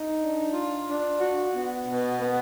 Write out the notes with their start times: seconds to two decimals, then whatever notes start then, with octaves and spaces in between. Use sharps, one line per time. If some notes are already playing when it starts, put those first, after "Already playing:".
Already playing: D#4
0.18 D4
0.53 F4
0.86 D4
1.20 F#4
1.54 B3
1.88 B2
2.21 B3